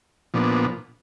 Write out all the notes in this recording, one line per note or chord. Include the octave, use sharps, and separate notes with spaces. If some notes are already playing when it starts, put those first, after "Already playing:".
A#2 F3 B3 D4